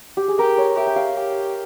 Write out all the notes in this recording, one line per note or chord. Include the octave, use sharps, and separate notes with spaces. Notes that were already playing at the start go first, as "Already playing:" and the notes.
G4
G#4
G4 A#4
C#5
G4 E5
G5
F5
G4